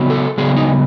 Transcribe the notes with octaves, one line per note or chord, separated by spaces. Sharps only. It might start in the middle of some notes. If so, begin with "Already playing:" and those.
Already playing: C#3 F#3 B3
A4
C#3 F#3 B3 G#4
D#4